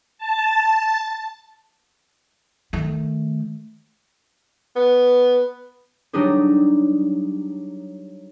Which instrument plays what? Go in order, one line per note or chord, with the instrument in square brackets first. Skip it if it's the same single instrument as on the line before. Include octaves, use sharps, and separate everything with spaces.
[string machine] A5
[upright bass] D#3 A3
[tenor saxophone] B3
[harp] F#3 G3 D4 D#4 G4 G#4